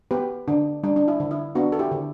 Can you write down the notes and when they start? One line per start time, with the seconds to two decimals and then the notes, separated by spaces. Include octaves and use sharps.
0.11 B3 G4 B4
0.48 D3 D4
0.83 G3 D4
0.96 D4
1.08 E4
1.20 D3
1.31 E4
1.55 B3 D4 F#4
1.72 A4
1.79 E4 G4
1.91 D3